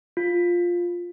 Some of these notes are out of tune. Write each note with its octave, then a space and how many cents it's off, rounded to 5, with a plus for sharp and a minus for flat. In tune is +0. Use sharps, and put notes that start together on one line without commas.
F4 +5